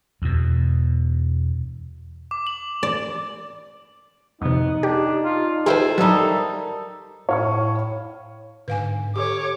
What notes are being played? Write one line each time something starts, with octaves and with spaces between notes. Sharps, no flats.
E2 B2
D6
F#7
D5
F2 C3 B3 D#4
D4 G4
F4
E4 F4 G4 A4 B4 C5
F#3 G3 D#4 A4 A#4
A2 C#5 F5 C#6
G#2 D3 B4 F5 G#5
G4 A4 C#5 D6